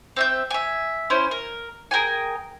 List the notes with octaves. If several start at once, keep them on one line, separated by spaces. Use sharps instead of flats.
C4 E5 G6
E5 G#5
C#4 E4 C5
A#4
G#4 A#4 G5 G#5